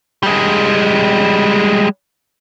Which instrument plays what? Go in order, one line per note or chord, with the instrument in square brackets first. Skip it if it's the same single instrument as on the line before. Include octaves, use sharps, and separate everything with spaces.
[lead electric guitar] G3 G#3